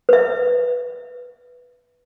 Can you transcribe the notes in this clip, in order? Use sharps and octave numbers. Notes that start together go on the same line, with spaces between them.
B4 E5